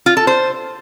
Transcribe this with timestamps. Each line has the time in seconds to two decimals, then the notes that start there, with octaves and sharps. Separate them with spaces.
0.06 F4
0.17 A4
0.27 C5